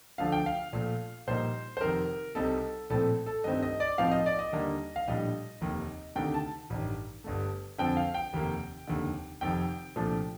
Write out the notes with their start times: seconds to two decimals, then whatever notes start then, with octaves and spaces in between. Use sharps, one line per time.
0.18 D2 D3 F3 A3 D4 F5
0.32 G5
0.46 F5
0.73 A#1 A#2 A3
1.27 A#1 A#2 G3 A#3 D#4 C5
1.77 C5
1.81 F1 F2 D#3 A#4
2.35 C2 C3 G3 C4 D#4 A4
2.90 A#1 A2 A3 C4 A4
3.26 A4
3.44 G2 D#3 A3 C4 D#5
3.63 D#5
3.80 D5
3.98 A2 F3 C4 D#4 F5
4.12 D#5
4.26 D5
4.39 D#5
4.53 D#2 D3 G3 A#3 D4
4.96 F5
5.07 A#1 A2 G3 D4 D#5
5.61 F1 D#2 D#3
6.15 D2 C3 D#3 A3 D4 G5
6.34 A5
6.70 A1 G2 D#3
7.24 G1 G2 D3 A3
7.78 F2 D3 F3 C4 G5
7.97 F5
8.14 G5
8.33 F1 D#2 D#3 A#3
8.87 F1 D#2 D3
9.41 F1 F2 D#3 G5
9.96 C2 A#2 F3 A3 D4